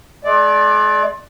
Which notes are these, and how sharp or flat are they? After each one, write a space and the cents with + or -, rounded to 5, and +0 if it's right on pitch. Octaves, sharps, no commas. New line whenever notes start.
G#3 +45 D5 +0